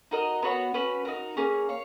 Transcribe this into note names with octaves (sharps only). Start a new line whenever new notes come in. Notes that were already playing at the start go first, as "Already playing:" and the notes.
D#4 F#4 A#4 D#5
B3 F#4 C#5 F#5
C#4 F#4 B4
D#4 F#4 A#4
A#3 C#4 G#4
C#5 F5